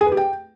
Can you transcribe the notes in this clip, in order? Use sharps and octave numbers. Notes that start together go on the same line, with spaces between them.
G#4
B4
G4
G5